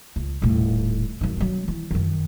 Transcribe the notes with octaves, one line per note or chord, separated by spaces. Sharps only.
C#2
D#1 A2
F#2 D#4
F#3 C#4
E3
F#2 D#3